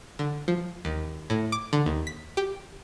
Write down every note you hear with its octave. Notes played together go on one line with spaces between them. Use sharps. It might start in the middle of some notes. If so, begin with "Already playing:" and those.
D3
F3
D#2
A2
D6
D3
D#2
B6
G4